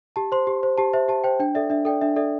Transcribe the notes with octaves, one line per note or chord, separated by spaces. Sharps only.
G4 A5
C5 C6
G4
C5
G4 A5
C5 E5
G4 A5
C5 G5
D4 G5
A4 D5 E5
D4 E5
A4 D5 G5
D4 E5
A4 D5 E5